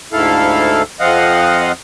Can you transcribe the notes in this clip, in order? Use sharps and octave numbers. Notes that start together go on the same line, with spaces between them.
D2 G#2 E4 A4 F5
F2 F3 C4 D#5 F5 F#5